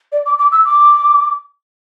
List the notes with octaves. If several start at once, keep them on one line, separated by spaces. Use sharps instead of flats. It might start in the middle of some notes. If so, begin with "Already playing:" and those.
D5
D6
D6
E6
D6